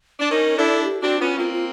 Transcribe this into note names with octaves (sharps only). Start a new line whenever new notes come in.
D4
C#4 D#4 A#4
D4 E4 A4
G4
C4 D4 F#4
B3 C#4 F4
A#3 C4 F4
F4